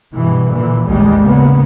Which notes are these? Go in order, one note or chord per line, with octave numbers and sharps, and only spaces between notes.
G2 B2 E3
A#2 D3 E3
A1 D#2 G3 G#3
C#3 A#3 B3